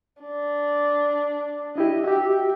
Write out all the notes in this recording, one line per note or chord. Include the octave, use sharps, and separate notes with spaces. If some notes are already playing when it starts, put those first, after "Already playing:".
D4
D4 E4 G4 D#5
F#4 G4 E5